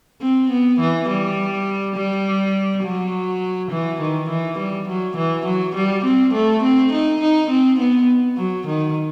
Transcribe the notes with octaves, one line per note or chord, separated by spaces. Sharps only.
C4
B3
E3
G3
G3
F#3
E3
D#3
E3
G3
F#3
E3
F#3
G3
C4
A3
C4
D#4
D#4
C4
B3
F#3
D#3